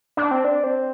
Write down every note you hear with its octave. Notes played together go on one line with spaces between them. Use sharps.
D4
C4
D4
C4